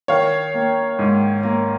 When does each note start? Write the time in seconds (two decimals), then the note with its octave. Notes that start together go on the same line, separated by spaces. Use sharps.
0.08 D#3 C#5 F5
0.54 A#3
0.99 G#2
1.43 A#3